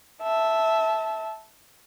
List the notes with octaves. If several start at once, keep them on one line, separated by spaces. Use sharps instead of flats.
E5 A5